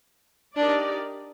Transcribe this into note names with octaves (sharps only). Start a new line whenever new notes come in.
D4 D#4 G4 A#4 D5